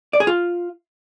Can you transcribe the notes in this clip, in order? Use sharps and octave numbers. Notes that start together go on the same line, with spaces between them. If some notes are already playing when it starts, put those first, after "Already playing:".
D5
G#4
F4